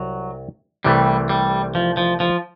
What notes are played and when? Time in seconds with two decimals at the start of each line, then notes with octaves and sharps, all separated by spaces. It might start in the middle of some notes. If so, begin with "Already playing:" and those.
Already playing: C2 F#3
0.85 C2 C3 E3 G3 A3
1.29 G3
1.75 F3
1.97 F3
2.20 F3